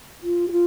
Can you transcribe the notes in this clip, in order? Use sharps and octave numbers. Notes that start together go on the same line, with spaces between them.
F4
G4
F4